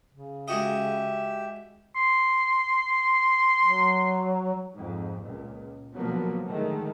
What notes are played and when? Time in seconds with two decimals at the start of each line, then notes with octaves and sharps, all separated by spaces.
0.11 C#3
0.48 G#3 F#4 G4 D#5 E5
1.96 C6
3.64 F#3
4.74 F2 G#2
5.21 C#2 A#2
5.95 B2 D3 F3 F#3 A#3 B3
6.45 A2 D3 D#3 G#3 A3